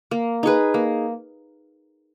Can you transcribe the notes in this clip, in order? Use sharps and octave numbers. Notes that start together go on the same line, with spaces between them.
A#3
D#4 G#4 B4
A#3